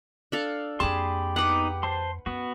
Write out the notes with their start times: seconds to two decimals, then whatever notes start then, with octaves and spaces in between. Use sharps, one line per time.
0.32 D4 A4 F5
0.80 F2 A#3 G4 G#4 A5 B5 C6
1.36 B3 D#4 B4 F#5 D6
1.83 C5 A5 C6
2.26 F#2 B3 F#4